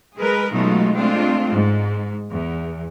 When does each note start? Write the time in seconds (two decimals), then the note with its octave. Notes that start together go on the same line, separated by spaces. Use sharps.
0.16 G#3 G#4 A#4 B4
0.53 B2 F#3 G#3 A3 D#4 F4
0.95 G#3 A3 C4 D4 F4
1.51 G#2
2.32 E2